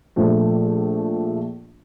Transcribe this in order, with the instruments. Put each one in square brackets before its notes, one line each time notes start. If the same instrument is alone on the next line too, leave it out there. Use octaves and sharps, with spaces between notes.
[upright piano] A#1 F3 A3